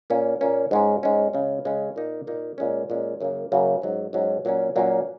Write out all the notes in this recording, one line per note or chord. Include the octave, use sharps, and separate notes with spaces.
A#2 A#3 C#4
A#2 A#3 C#4
G#2 G#3 C#4
G#2 G#3 C#4
C#3 G#3 C#4
C#3 G#3 C#4
A#2 A#3 D#4
A#2 A#3 D#4
A#2 G#3 C#4
A#2 G#3 C#4
F#2 C#3 F#3 A#3
F#2 C#3 F#3 A#3
G#2 F#3 C#4
G#2 F#3 C#4
A#2 F#3 A#3 C#4
A#2 F#3 A#3 C#4